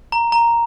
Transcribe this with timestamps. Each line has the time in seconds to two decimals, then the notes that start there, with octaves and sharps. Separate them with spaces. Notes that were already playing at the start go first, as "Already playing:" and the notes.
0.12 A#5
0.32 A#5